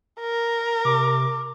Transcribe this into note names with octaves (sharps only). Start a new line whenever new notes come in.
A#4
C3 D6